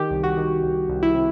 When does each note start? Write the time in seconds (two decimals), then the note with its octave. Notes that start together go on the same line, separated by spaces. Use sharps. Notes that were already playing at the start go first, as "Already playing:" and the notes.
Already playing: D#3 G4
0.10 C2
0.23 F#4
0.37 D#3
0.63 C2
0.89 C2
1.03 E4
1.14 C3